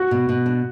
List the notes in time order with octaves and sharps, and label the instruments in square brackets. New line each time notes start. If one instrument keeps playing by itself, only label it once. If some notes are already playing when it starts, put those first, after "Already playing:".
Already playing: [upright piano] F#4
[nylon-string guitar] B2
B2
D4